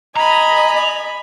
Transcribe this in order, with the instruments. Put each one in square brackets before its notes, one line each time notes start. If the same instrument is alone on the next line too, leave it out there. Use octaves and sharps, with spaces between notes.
[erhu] D#5 [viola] G#5 B5 [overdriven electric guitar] A#5